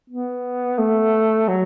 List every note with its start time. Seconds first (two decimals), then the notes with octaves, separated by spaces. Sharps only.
0.10 B3
0.79 A3
1.48 F#3